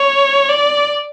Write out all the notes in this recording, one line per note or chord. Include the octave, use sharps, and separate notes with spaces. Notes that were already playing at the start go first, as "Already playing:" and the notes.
Already playing: C#5
D5